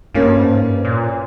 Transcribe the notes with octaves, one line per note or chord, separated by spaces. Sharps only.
G2 A#3 C#4
G#2
G2
A#2